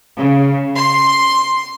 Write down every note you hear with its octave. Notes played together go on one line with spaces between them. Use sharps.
C#3
C6